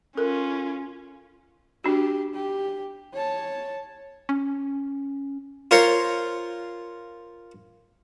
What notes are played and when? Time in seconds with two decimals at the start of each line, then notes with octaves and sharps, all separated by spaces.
0.17 C#4 F4 A4 A#4
1.84 D4 F#4 G4
2.34 G4
3.13 C#5 A5
4.29 C#4
5.71 F4 A#4 C5 C#5 C6